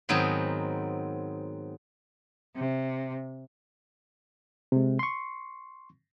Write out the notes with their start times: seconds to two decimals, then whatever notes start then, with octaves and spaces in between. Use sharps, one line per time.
0.09 G#2 D#3 F#3 B3 C4
2.55 C3
4.72 C3 G#3
4.99 C6 C#6